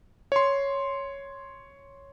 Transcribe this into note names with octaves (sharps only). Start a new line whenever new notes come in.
C#5 C6